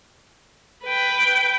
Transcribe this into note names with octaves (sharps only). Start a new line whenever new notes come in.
B4 G5